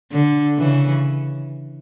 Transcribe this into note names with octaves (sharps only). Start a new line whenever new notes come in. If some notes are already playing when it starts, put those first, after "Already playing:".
D3
C#3 E3